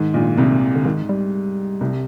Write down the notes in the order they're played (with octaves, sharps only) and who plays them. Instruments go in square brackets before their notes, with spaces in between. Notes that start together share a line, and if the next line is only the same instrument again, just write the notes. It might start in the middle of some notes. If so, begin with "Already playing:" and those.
Already playing: [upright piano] G#2 [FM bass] D#3
[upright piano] A#1 A#2
C2 C3
[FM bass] D3
[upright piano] G#2 [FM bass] D#3
[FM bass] G3
[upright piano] C2 C3